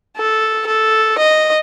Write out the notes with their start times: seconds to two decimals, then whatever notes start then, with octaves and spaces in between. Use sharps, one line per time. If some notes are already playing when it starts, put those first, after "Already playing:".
0.17 A4
0.66 A4
1.18 D#5